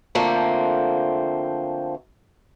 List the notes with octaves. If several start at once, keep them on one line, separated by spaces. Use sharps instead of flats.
D3 F3 A3 A#3 C4